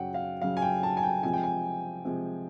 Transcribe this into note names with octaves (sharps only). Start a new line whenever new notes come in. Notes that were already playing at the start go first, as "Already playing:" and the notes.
Already playing: F#2 C#3 F#3 F#5 G5
F5
F#2 C#3 F#3 F5
G#5
G5
A5
G#5
G5
C3 F3 G#3 G#5
G5
G#5
C3 F3 G#3